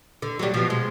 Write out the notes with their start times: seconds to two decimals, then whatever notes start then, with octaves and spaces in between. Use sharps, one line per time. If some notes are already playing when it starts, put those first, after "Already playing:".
0.22 D3
0.39 F#3 G3
0.54 B2 F3
0.70 G#3